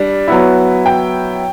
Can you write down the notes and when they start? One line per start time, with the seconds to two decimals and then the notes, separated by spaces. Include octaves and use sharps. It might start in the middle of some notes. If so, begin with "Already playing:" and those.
Already playing: G3 D4
0.28 F#3 B3 E4
0.86 G5